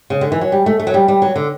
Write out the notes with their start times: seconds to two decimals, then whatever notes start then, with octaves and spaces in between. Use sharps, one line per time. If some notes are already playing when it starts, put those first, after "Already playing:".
0.10 C#3
0.21 D3
0.32 E3
0.41 F#3
0.52 G3
0.66 A3
0.80 A3
0.87 F#3
0.94 G3
1.08 G3
1.22 F#3
1.36 D3